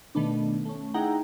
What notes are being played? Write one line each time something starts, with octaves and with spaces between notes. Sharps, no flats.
B2 D#3 A3 B3 D4
A3 C#4
D#4 E4 G#4 F#5 G5 A#5